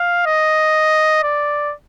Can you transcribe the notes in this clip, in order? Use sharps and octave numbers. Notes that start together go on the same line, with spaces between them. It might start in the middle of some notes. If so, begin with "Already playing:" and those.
Already playing: F5
D#5
D5